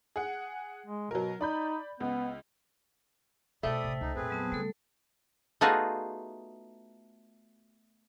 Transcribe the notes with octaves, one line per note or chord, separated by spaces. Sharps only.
G#4 F#5
G#3
B2 F#3 A#4
D#4 D5 B5 G6
C#2 B3
B2 A3 F4 C5 D5 G5 B5 D#6
A1 C3
C#2 D#4
F2 A#2 C4 G#4 B4
F#3 B3 A5
C#3 G3 A3 A4
A3 B3 D#4 F4 F#4 G#4